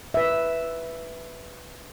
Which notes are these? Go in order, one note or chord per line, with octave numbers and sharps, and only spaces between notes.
B4 E5